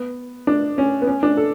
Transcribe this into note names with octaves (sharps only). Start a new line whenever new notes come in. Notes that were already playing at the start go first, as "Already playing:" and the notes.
Already playing: B3
D4
C#4
B3
C#4
D4
A4